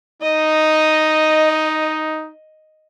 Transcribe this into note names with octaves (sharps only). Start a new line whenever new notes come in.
D#4 D#5